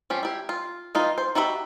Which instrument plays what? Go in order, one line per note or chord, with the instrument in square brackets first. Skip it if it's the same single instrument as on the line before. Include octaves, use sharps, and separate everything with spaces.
[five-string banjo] F3 C#4 G4
E4 G4
F4
E3 D#4 F4
C5
D#4 F#4 G4 E5 B5